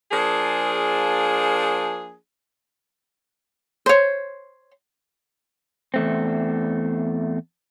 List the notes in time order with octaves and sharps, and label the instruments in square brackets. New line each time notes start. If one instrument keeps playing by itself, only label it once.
[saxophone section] F3 A#3 D4 G#4
[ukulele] C5 C#5
[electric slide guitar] E2 A3 C4